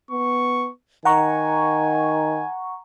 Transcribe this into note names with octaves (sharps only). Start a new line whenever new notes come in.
B3 C#6
D#3 F#5 G#5 A#5 C#6